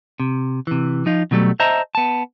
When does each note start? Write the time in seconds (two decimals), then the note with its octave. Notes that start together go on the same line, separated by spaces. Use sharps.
0.20 C3
0.67 C3 E3
1.06 F3 D#4 F4
1.31 B2 D3 F#3 G3 A3
1.60 C5 D#5 E5 A5 A#5
1.95 B3 A5